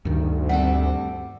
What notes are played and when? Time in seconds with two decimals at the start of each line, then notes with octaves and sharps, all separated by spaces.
0.05 D2 G2 D#3
0.49 G3 C4 A4 F#5